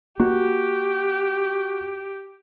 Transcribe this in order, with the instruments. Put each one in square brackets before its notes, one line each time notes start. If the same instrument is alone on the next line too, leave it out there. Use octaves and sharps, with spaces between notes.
[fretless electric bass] A#3 [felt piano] F#4 [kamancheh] G4